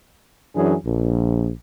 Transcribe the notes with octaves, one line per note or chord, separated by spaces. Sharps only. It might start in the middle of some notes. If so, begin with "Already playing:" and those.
F#2 E3 F#3 D4 G#4
A#1